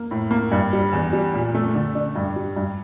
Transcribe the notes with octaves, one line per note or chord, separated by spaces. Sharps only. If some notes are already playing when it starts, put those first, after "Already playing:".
Already playing: A#3
A2
A#3
G2
G3
E2
G3
A#2
A3
D3
D4
G2
G3
G2